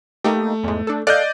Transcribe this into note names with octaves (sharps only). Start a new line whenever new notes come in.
A3 A#3 D#4 G4
E2 G#2
D4 A4
A4 D5 D#5 F5 F#6 G6